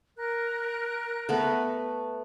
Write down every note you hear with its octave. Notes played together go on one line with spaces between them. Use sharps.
A#4 F#6
A3 B3 B4